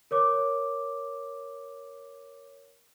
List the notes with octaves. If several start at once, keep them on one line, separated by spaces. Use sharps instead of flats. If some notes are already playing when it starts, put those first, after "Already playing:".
A#4 C#5 D6